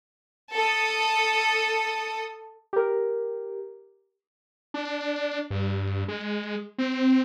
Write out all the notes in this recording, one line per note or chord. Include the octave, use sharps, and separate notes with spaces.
A4 D#6
G4 A#4
D4
G2
G#3
C4